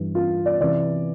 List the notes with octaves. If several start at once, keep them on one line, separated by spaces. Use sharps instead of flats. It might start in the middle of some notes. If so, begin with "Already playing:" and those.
Already playing: G2 E3
F4
D5
C3 E3 D5